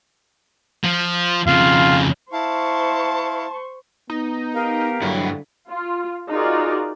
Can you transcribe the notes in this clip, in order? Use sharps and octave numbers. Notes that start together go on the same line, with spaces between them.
F3
F2 C#3 F4
E4 C5 F5 A5 C#6
B3 D#4
G4 A#4 F5
G2 D3 F#3 E4
F4
D#4 F4 F#4 G#4 A#4 D5